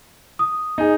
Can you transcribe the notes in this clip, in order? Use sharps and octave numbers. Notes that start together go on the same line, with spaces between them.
D#6
D#4 G#4